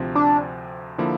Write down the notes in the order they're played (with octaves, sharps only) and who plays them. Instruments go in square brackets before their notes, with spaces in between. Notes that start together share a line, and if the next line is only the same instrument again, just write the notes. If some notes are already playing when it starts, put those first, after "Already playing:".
Already playing: [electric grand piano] D2 C3 F3 C4
[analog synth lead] D4
[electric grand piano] D3 F3 A#3 E4